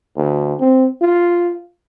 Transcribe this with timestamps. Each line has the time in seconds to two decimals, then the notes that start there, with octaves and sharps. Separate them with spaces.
0.17 D2
0.60 C4
1.01 F4